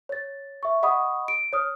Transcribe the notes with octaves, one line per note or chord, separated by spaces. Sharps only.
C#5 A6
E5 C#6
D#5 F#5 B5 C#6 D#6
D7
C#5 D#6 F6